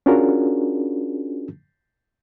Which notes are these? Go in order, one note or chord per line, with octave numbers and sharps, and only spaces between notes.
C#4 D4 F4 F#4 G#4 A#4